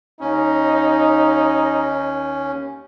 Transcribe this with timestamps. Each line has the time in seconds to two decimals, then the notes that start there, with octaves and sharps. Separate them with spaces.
0.20 D#2 C#4 D#4